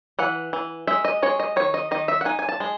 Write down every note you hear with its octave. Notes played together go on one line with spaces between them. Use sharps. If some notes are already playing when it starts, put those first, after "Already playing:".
E3 F#5
E3
G#3 E5
D#5
G#3 C#5
D#5
D#3 C#5
D#5
D#3 D#5
E5
F#5
D#4 G#5
G#5
A5
G#3